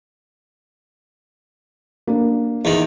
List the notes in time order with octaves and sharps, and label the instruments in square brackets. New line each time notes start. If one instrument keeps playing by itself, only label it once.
[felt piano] A#3 D4
[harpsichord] E2 D#3